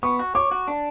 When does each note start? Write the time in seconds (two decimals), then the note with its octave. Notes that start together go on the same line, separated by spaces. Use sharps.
0.03 B3 C#6
0.19 F#4
0.35 C#5 D6
0.51 F#4
0.68 D4